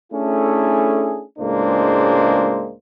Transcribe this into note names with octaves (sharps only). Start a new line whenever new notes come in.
A3 C#4 D4 E4 G#4 A4
C#2 A2 G#3 A#3 D4 C5